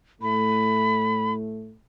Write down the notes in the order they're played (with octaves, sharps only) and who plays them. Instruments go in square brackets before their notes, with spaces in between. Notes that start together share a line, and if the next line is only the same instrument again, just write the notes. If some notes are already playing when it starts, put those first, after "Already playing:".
[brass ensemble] A2 A3 [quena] B5